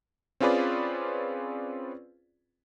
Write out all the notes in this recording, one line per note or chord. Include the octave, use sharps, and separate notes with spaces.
C4 C#4 F4 G#4 B4 D5